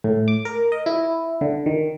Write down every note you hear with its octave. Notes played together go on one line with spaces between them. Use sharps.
A2
D6
A#4
D#5
E4
D3
D#3